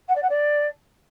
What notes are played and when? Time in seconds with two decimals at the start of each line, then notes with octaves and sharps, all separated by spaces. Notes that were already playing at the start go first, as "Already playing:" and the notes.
0.08 F#5
0.15 D5
0.22 F#5
0.29 D5